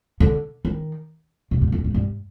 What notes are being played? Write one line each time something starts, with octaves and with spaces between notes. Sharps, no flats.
D3
D#3
C3
G#2
F2
G#2
G2